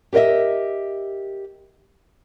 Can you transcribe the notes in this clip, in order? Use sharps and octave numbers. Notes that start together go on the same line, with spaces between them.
G4 A#4 C5 D#5 E5